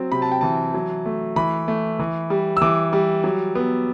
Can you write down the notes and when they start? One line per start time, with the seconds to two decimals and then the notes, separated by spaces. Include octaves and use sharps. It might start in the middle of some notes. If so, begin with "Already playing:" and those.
Already playing: F#3 C4
0.12 C3 B5
0.22 A5
0.32 G5
0.41 E3 A5
0.74 F#3
1.06 A3
1.36 E3 B5
1.68 A3
1.99 E3
2.30 G3
2.57 E6
2.62 E3 D6
2.93 G3
3.24 F#3
3.55 B3